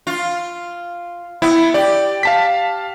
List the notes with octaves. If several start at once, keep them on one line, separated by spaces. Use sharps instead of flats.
F4
B3 E4
G4 D5
F5 A5 B6